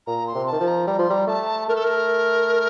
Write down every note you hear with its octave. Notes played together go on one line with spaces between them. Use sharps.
A#2 A#5
C6
C3
A5
D#3
F3
A#5
G3 A#5
F3 C6
G3 A#5
A3 A5
A3 A#4
A4
A#4